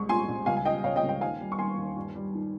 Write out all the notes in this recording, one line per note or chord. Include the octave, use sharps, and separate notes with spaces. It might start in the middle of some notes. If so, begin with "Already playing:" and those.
Already playing: C2 G#3 C#6
A#2 G#5 C6
C2
C#2 F5 G#5
G#5
G3 D#5 G5
C#3 C#5 F5
D#5 G5
C#2
D#5 G5
D#2 F5 G#5
G3
C#6
D#3 G#5 C6
D#2
G2
G3
D#3